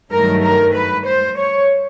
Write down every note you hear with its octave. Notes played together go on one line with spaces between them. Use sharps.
G2 D#3 F#3 A3 A#4
A#4
B4
C5
C#5